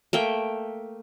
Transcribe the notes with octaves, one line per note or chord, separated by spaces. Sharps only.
A3 A#3 G5